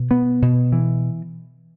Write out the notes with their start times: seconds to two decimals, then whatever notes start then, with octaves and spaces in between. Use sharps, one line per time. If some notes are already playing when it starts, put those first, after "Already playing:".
Already playing: B2
0.11 B3
0.42 B2
0.72 E3